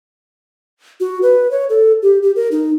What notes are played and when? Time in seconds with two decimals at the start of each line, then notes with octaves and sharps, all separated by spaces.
1.00 F#4
1.22 B4
1.51 C#5
1.69 A4
2.02 G4
2.22 G4
2.36 A#4
2.52 D#4